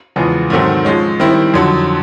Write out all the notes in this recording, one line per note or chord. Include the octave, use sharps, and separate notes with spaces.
E2 C#3 F3 G#3 B3
G#2 D#3 F#3 A3 C4
F3 G#3 C#4
D#3 G3 C4 E4
F2 D3 F#3